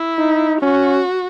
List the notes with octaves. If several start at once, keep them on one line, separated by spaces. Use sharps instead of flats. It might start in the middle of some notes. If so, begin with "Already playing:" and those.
Already playing: E4
D#4
C#4 F#4